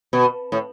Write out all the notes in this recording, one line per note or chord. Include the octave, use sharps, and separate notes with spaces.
B2
A2